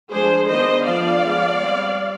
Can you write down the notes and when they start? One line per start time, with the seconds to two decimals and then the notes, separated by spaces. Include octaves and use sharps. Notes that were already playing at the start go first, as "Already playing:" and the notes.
0.11 F3 G#3 D4 G#4 C5
0.49 D#3 G#3 B3 D4 C5 D#5
0.86 D3 F3 B3 D4 D5 F5
1.23 F3 G#3 B3
1.61 G3 C4